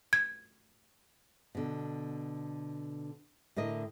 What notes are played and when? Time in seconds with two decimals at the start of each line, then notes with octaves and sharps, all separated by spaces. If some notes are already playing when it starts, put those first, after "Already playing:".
0.13 G#6
1.55 B2 D3
3.56 A2 D3 A#4 D#5